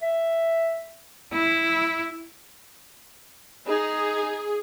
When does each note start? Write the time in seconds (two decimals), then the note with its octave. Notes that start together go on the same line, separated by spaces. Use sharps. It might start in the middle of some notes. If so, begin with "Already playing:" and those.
0.02 E5
1.33 E4
3.67 D#4 G#4